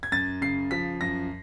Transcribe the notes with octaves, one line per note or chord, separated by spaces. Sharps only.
G#6
F#2 A6
C#3 C7
F3 B6
F#2 A#6